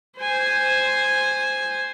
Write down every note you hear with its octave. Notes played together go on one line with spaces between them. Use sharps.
C5 G#5